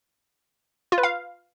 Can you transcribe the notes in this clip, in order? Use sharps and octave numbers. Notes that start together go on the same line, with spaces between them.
F4
B4
F5